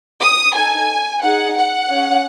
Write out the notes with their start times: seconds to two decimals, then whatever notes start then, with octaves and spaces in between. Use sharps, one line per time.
0.21 D#6
0.54 D#4 A4 G#5
1.22 D#4 G#4 F#5
1.56 F#5
1.88 C#4 G#4